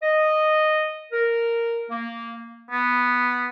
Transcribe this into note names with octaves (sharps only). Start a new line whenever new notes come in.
D#5
A#4
A#3
B3